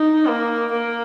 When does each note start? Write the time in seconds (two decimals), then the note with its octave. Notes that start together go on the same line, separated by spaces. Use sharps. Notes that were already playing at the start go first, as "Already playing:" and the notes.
Already playing: D#4
0.28 A#3
0.71 A#3